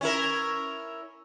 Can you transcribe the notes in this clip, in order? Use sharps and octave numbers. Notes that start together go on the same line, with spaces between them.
C#4 E4 A#4